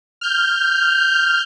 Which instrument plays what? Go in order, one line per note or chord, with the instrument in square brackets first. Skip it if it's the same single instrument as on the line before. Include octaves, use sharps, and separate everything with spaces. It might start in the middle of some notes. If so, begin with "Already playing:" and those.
[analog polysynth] F6 G6